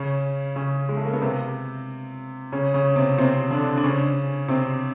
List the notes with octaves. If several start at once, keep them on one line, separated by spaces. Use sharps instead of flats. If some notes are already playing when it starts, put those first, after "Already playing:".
Already playing: C#3 C#4
C#3 C#4
G#3
A3
A#3
B3
C3 C4
C#3 C#4
C#3 C#4
C3 C4
C3 C4
D3 D4
D4
C#3 C#4
C3 C4